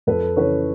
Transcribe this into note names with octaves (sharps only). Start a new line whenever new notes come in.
F2 A4 B4
C#3 E3 B4 C#5